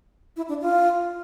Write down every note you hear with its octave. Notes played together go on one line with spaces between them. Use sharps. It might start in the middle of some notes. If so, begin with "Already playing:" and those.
E4
D4
F4